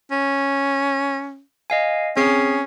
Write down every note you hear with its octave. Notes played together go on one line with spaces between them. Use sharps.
C#4
D#5 F5 G#5
C4 C#4 G#4 C7